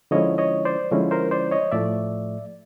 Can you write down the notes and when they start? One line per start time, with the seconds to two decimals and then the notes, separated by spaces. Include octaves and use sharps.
0.11 D3 F3 G#3 C#4 E4 C#5 D#5
0.38 C#5 D#5
0.65 C5 D5
0.91 D3 F3 G#3 C#4 E4
1.11 A#4 C5
1.31 C5 D5
1.51 C#5 D#5
1.72 A2 F3 A3 D5 E5